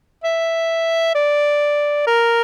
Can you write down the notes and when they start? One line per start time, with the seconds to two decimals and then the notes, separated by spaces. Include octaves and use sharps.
0.24 E5
1.15 D5
2.07 A#4